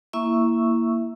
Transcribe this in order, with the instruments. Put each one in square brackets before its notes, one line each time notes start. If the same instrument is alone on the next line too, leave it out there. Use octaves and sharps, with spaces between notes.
[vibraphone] A#3 E4 E5 C#6 E6